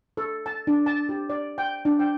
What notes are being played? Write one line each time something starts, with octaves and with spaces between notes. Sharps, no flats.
A4
A5
D4
A5
G4
D5
G5
D4
G5